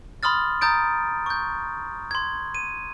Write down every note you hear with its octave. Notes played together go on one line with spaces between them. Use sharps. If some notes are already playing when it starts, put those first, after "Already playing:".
B5 C6 D#6 F6 A6
A#5 D#6 G6 A6 D7
C#6 G6
C6 G#6
D#7